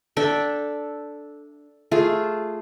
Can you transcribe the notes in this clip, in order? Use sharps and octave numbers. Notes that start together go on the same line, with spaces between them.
D4 A4 E5 G5
A3 F4 G#4